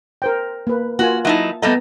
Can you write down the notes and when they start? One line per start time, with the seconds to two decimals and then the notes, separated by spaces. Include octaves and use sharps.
0.22 A#4 C5 G5
0.67 A#3 B4
0.99 A#3 F4 F#4 G#5
1.25 F#3 D#4 E4 E5 A5
1.62 G3 A3 B3 D#5 A#5